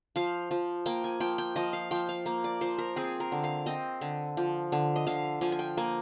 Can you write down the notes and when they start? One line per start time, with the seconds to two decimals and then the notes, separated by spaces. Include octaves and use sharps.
0.16 F3 F5
0.51 F3
0.86 A#3 G5
1.04 G#5
1.20 F3 G5
1.38 G5
1.56 F3 D#5
1.73 F5
1.91 F3 G5
2.09 F5
2.26 A#3
2.44 D5
2.61 F3 C5
2.78 A#4
2.96 C4 G#4
3.20 A#4
3.32 D3
3.44 F5
3.66 C4 D#5
4.01 D3
4.37 F3
4.72 D3
4.96 D#5
5.07 D3 F5
5.41 F3 G#5
5.52 G#5
5.59 G5
5.77 A#3 G#5